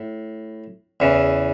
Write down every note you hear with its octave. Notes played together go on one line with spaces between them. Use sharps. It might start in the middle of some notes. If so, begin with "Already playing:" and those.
Already playing: A2
E2 C#3 E3